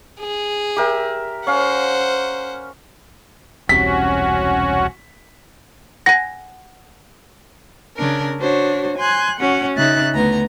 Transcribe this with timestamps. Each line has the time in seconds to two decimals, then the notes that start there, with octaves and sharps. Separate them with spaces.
0.20 G#4
0.76 G4 A#4 E5
1.47 C#4 C5 F5 F#5
3.69 E1 C2 C3 C#4 F#4 B6
6.06 F#5 G#5 A#6
7.97 C#3 D4 A#4
8.39 D4 F#4 C5 C#5
8.98 G#5 C6 F#6 G6
9.40 C#4 F#4 F#5
9.77 C#3 D#4 E5 F#6 A6
10.14 D2 B3 A#5